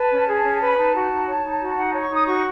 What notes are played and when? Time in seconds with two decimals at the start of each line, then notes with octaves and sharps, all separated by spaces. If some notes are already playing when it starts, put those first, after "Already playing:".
Already playing: B4 A5
0.11 C#4
0.27 G#4
0.43 C#4
0.61 B4
0.66 B5
0.77 D#4 A5
0.94 F#4
1.10 D#4
1.27 C#5
1.43 D#4
1.60 F#4
1.77 D#4 F#5
1.89 C#5 A5
2.02 C#6
2.11 D#4 D#6
2.26 F#4 C#6